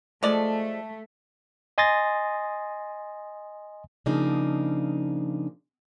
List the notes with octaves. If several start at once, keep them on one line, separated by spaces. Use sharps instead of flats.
F3 G#3 A3 D5
D#5 G#5 C6 D#6 A6 A#6
C#3 F3 A#3 D4 D#4